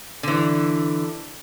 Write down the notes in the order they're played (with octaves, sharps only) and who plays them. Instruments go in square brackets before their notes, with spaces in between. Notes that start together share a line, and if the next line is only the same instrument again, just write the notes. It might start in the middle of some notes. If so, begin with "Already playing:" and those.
[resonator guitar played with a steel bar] D3 E3